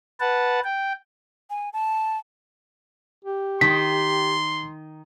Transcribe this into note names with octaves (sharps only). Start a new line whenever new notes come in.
B4 F#5 A5
G5
G#5
A5
G4
D#3 C6 B6